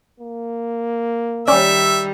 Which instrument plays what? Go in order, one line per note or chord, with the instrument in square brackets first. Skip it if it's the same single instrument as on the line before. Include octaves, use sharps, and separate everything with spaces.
[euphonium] A#3
[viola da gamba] D#3 G3 [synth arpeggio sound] C#4 D5 [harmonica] E5